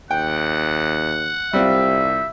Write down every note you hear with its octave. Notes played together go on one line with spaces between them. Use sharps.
D#2 F#5 G5
C2 G3 C4 F4 E5